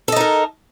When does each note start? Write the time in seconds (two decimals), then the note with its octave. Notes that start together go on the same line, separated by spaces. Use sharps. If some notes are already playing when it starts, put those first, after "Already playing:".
0.08 A4
0.12 D#5
0.16 D#4
0.20 A#4